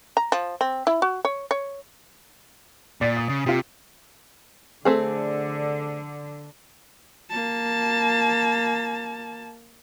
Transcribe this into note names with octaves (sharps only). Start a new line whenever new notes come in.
A#5
F3
C4
E4
F#4
C#5
C#5
A#2 D5 A6
D#6
C#3
C3 F4 G4
D3 A3 C4 G#4
A#3 A5